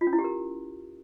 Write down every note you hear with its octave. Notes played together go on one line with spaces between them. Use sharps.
F4
C#4
E4
G4
A#4